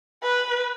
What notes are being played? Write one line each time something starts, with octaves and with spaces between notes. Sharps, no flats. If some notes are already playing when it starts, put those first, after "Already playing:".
B4